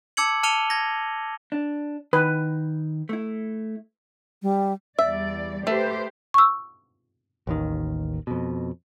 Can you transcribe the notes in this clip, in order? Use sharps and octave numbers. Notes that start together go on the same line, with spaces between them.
A5 D6 E6 G#6 C#7 F#7
A5 F6 C#7 D#7 F7 G7
G#6 A#6
D4
D#3 B4
A3 E4
G3
E2 G3 D5 E5
A3 G4 B4 C5
C#6 E6
A1 D#2 D#3
F2 B2